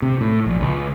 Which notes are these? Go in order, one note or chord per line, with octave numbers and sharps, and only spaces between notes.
C3
A2
A#1
C#2